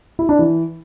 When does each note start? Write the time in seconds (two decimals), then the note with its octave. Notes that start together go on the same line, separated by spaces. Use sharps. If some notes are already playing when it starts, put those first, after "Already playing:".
0.19 E4
0.29 D4
0.39 E3